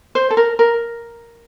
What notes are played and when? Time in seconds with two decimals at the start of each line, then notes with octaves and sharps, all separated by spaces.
0.15 C5
0.30 A4
0.37 A#4
0.59 A#4